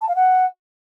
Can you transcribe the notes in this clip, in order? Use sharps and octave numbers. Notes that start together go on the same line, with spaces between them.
A5
F5
F#5